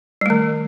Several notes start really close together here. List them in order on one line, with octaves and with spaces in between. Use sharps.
G3 A3 D#3